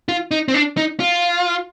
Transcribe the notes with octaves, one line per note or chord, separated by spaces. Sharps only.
F4
D#4
C4
D4
D#4
F4